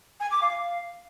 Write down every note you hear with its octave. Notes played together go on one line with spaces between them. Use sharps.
G#5
D6
F5